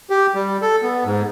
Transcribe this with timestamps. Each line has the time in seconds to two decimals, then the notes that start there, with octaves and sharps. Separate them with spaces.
0.10 G4
0.35 G3
0.61 A4
0.83 B3
1.05 G#2